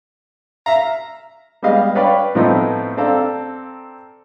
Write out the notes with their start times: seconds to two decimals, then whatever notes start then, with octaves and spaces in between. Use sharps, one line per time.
0.66 E5 F5 A#5
1.63 G3 G#3 B3 D#5 F5
1.95 B4 C#5 D5 F5 G5 B5
2.35 A2 F3 B3 C4 D#4
2.97 C4 A4 D5 F5 A#5